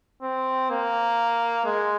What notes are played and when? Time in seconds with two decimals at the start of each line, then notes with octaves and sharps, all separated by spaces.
0.22 C4
0.70 A#3
1.65 G#3